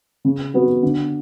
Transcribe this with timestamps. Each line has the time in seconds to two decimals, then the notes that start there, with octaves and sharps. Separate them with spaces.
0.25 C#3
0.54 F#3 B3 F#4
0.83 D3